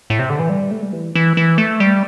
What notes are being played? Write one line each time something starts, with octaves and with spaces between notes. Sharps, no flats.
A2
C3
D3
E3
G3
A3
G3
E3
E3
E3
A3
G3